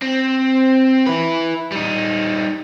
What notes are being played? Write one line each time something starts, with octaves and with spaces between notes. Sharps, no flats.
C4
E4 B4
G3 D#4